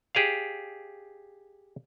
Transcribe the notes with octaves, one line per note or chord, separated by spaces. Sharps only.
G4 G#4 D5 F5